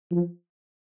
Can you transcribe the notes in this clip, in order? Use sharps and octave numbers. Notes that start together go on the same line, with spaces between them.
F3